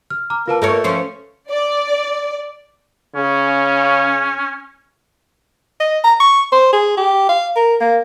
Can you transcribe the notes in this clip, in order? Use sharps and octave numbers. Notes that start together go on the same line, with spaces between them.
F6
A#5 D6 F6
A#3 F4 B4 A5
A3 A#3 A#4 C#5
F3 C#4 C5
D5
C#3 C#4
D#5
A#5
C#6
C5
G#4
G4
F5
A#4
A#3